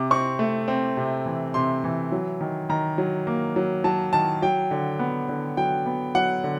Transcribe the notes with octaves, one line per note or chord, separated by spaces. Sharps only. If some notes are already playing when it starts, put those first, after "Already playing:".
Already playing: C3 D6
C4 C#6
A3
C4
C3
E3
C3 C6
E3
F#3
D#3
D#3 A#5
F#3
A#3
F#3
F#3 A5
D#3 A5
F#3 G5
D3
B3
D3
F#3 G5
B3
F#3 F#5
D3